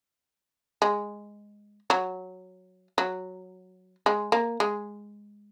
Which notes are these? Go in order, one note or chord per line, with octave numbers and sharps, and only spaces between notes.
G#3
F#3
F#3
G#3
A#3
G#3